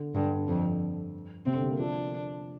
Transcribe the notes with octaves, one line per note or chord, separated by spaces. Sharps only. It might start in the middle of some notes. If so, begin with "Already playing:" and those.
Already playing: D3
G2 D3
F2
C3 C4
D3
G3
A#3
F3 D4